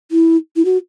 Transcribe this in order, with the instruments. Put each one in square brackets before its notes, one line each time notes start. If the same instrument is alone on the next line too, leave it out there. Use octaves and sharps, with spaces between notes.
[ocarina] E4
E4
F#4